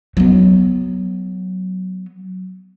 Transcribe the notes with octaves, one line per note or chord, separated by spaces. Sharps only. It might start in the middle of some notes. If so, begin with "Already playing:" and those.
F#3 B3